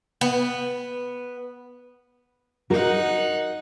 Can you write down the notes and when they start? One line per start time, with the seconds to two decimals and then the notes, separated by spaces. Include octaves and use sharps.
0.21 B3
2.70 D#4 F#4 A#4 F#5